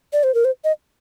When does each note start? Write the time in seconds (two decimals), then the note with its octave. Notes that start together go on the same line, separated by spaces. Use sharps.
0.13 D5
0.23 C5
0.34 A#4
0.45 C5
0.64 D#5